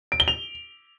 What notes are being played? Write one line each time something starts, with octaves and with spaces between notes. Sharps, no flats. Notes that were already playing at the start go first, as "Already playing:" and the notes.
D7
G7
F7